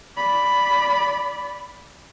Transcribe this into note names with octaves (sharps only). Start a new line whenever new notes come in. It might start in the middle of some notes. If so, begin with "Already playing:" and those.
D5 B5